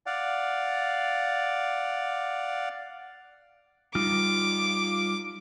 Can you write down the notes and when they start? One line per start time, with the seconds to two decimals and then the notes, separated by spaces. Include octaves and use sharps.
0.06 D5 F5 F#5
3.95 G3 D#4 F4 D6